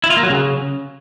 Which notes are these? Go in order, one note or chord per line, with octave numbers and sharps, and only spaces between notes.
E4
F4
A#3
F#3
C#3